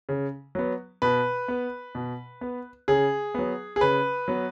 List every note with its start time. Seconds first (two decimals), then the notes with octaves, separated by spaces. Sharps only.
0.09 C#3
0.55 F#3 B3
1.02 B2 B4
1.48 B3
1.95 B2
2.41 B3
2.88 C#3 G#4
3.35 F#3 B3
3.76 G#4
3.81 C#3 B4
4.28 F#3 B3